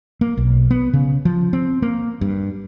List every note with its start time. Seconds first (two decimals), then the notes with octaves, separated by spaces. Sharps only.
0.21 A#3
0.37 B1
0.71 B3
0.94 C#3
1.25 F3
1.53 C4
1.82 A#3
2.21 G2